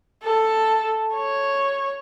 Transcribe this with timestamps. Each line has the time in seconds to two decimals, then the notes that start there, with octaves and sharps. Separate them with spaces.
0.23 A4
1.15 C#5